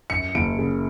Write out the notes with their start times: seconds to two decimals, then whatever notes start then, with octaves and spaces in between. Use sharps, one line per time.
0.10 F#2 C#7
0.35 F#1 D7
0.59 C#3